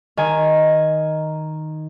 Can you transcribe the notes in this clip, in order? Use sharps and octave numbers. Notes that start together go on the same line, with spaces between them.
D#3 G#5